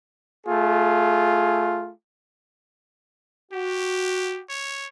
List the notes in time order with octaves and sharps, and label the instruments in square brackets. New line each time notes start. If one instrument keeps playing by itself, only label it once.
[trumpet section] A3 F4 G#4
[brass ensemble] F#4 [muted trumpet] G4
[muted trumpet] C#5